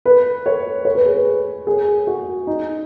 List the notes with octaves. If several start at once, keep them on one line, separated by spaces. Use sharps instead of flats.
B4
C#5
C#5
B4
G#4
B4
G#4
F#4
D#4